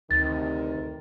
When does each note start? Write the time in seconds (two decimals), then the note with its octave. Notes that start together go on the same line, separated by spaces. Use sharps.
0.11 D2 C3 D#3 A6